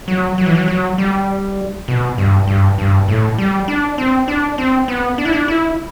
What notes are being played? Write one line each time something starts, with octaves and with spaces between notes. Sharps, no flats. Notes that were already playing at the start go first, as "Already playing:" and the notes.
F#3
F#3
E3
F#3
F#3
G3
B2
G2
G2
G2
A2
G3
D4
C4
D4
C4
B3
D4
E4
D4
E4